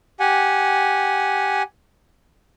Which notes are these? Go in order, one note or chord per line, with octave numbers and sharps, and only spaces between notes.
G4 F#5 G#5